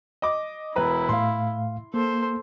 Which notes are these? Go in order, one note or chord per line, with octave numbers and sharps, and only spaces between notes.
D#5 D6
E1 E4 B4 A#5
A2 A3 F5 C6
A#3 A4 C5